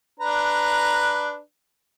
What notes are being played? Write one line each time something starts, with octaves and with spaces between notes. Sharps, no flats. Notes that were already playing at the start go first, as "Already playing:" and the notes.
D4 B4 A#5